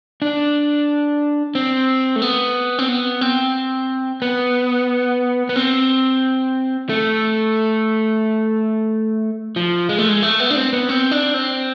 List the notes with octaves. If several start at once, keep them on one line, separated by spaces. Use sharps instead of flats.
D4
C4
A3
B3
C4
B3
C4
B3
B3
C4
A3
F3
G#3
A3
G#3
A3
B3
D4
C4
B3
C4
D4
C4